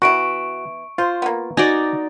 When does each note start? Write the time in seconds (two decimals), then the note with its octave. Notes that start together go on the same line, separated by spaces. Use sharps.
0.02 E3 B3 E4 F#4 C#6 D7
0.98 F4 C5
1.22 A#3 B3
1.57 D#4 F#4 D5 G#5